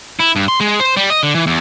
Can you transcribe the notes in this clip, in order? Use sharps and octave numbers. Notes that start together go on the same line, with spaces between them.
E4
G2
C6
G#3
C5
G3
D#5
D3
E3
E2